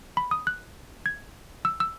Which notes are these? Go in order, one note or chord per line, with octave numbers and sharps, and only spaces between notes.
B5
D#6
F#6
G#6
E6
E6